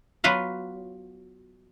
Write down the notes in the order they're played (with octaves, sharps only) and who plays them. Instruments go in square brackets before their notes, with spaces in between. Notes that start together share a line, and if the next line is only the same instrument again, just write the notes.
[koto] F#3 B3 F4 B4 F5